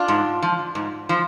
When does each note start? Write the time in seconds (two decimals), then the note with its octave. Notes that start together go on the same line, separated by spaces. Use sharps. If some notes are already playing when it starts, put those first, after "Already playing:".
Already playing: D4 F4
0.08 G#2
0.42 F3
0.75 G#2
1.09 F3